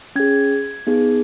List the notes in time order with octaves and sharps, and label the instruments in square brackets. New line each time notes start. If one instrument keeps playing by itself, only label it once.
[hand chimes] C#4 G#4 G#6
B3 D#4 G#4